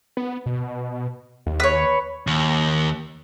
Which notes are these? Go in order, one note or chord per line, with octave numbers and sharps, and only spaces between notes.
B3
B2
D#2
B4 C#5
D#2